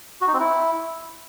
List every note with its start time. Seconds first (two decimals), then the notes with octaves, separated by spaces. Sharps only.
0.21 F#4
0.27 D#4
0.34 C4
0.40 E4